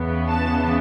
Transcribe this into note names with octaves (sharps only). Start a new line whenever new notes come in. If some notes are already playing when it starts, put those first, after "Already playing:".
Already playing: E2 C#3 E3 B3
A5